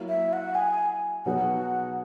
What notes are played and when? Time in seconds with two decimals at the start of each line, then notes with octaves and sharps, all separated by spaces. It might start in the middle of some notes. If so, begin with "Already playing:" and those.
Already playing: F#3 A#3 E4
0.08 E5
0.33 F#5
0.55 G#5
1.25 B2 F#3 B3 D#4 G#4 F#5